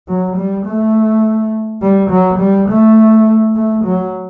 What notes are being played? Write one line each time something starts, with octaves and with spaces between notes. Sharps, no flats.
F#3
G3
A3
G3
F#3
G3
A3
A3
F#3